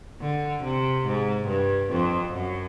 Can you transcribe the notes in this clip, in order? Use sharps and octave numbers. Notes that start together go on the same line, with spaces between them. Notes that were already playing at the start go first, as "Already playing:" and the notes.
D3
C3
G#2
G2
F2
F#2